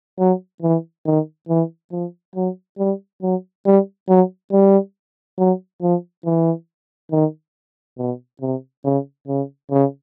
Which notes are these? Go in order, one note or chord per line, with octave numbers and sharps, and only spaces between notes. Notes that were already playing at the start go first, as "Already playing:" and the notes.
F#3
E3
D#3
E3
F3
F#3
G3
F#3
G3
F#3
G3
F#3
F3
E3
D#3
B2
C3
C#3
C#3
C#3